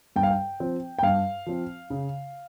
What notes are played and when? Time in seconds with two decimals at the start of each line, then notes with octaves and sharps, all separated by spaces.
0.16 G2 G5
0.23 F5
0.31 G5
0.60 F3 C4
0.99 G5
1.03 G2 F5
1.46 F3 C4
1.90 C#3